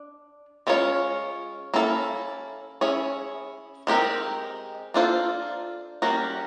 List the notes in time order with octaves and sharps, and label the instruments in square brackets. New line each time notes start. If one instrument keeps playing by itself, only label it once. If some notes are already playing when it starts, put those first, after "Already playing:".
Already playing: [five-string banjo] D4
G#3 C#4 F4 A4 C#5
A#3 C#4 E4 A4
C#4 E4 G#4 C#5
G#3 C4 D#4 G4 A#4
A#3 D4 F4 A4 C5
G3 A#3 C#4 F#4 A#4